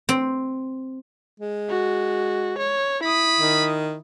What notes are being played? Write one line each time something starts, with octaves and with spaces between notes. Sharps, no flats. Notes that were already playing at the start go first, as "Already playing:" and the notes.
C4
G#3
F#4
C#5
E4 B5 D#6
D#3